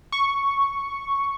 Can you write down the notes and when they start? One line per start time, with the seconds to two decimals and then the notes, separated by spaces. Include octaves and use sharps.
0.12 C#6